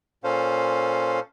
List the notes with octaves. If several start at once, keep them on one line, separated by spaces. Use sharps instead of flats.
A#2 C#4 A4 C5 F5